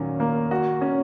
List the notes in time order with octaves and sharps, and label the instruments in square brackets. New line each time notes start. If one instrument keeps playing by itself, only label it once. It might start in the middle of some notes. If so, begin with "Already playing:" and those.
Already playing: [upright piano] A#2 F#3 C#4 [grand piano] D#3
[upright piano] A#3
F#4
C#4